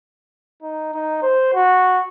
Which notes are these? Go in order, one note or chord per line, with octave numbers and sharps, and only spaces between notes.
D#4
D#4
C5
F#4